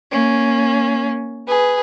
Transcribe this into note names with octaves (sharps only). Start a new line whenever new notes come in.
A#3 C#4
G#4 B4